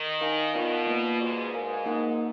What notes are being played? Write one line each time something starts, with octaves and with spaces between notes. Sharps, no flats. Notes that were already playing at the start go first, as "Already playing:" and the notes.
Already playing: D#3
D#4 A#4 F5 G#5
B2 B3 F4 A#4 D5 F5
A#3 F4 B4
G#2 F#4 B4 D5
G#2 F#4 A#4 F5 G#5
A#3 D#4 A#4 D#5 F#5